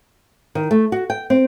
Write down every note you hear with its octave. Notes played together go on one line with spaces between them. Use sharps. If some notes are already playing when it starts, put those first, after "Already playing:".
D#3
A3
F#4
G5
C4